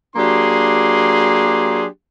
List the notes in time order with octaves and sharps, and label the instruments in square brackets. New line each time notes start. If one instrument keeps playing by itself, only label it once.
[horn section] F#3 A#3 D4 G4 G#4 C6